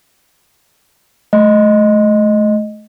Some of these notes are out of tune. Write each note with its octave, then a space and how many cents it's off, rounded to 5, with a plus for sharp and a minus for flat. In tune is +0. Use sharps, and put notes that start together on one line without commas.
A3 -30 D#5 +0